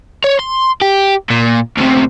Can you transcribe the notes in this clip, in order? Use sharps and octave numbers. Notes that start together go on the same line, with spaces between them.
C#5
C6
G4
A#2
D2 C3